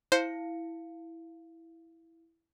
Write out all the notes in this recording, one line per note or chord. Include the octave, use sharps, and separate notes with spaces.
E4 C5 F5 C#7